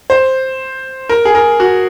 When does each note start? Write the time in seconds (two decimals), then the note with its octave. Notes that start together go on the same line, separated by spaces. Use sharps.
0.10 C5
1.09 A#4
1.25 G#4
1.35 A#4
1.60 F#4